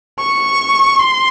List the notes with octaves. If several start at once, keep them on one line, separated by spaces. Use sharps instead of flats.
C#6
C6